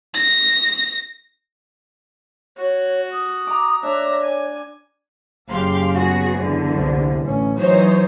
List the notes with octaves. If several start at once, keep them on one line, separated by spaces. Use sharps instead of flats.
A#6
F#4 C#5
D#6
A#5 D6
D4 C#5 D5 E5 A#5
G#5
F#1 C#3 G4 F5 C6
B3 F#4 G#4
E2 D3
C2
A1 C#4
E3 F#3 D#4 C5 C#5